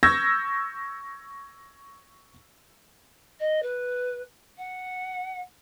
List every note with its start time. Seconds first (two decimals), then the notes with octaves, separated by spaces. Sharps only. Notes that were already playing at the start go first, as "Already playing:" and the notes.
0.03 C#6 E6 G6 G#6 A#6
3.39 D#5
3.62 B4
4.57 F#5